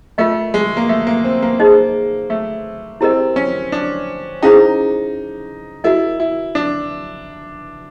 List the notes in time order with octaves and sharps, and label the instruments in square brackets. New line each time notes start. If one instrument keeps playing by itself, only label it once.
[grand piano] A3 [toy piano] F4 A#4 D#5
[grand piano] G#3
A#3
A3
A#3
C4
A#3
[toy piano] D#4 G#4 C5 D#5
[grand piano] A3
[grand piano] C4 [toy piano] E4 G4 A#4 D#5
[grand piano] C#4
D4
[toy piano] C#4 E4 G#4 C5 F5 [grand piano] D#4
[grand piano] E4 [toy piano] F#4 A#4 D#5
[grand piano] E4
D4